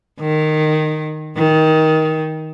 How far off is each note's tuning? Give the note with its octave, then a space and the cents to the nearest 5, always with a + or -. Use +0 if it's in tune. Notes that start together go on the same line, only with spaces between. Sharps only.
D#3 -15
D#3 +15